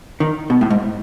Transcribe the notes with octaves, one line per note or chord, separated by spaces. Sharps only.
D#3
B2
A2
G#2